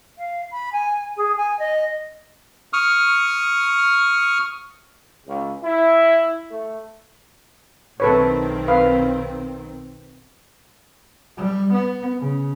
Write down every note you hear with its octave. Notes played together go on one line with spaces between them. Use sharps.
F5
B5
G#5
G#4
G#5
D#5
C#6 D#6 F6
C#2
E4
A3
B1 D#3 C4 A4 B4 C#5
B4 F5
G3
B3
C#3